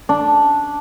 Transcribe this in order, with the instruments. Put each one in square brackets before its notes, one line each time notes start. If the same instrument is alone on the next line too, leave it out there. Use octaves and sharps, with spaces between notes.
[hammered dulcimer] D4